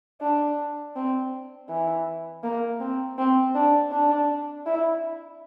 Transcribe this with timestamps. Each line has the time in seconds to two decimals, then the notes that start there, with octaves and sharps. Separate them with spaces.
0.21 D4
0.96 C4
1.69 E3
2.44 A#3
2.80 C4
3.18 C4
3.55 D4
3.92 D4
4.66 E4